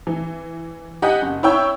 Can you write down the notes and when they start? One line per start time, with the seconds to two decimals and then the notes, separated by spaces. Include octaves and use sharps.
0.07 E3
1.02 G4 D#5 F#5 G#5
1.22 F#1
1.43 E4 C#5 G5 E6